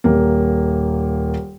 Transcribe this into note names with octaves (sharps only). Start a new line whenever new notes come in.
D#1 A#3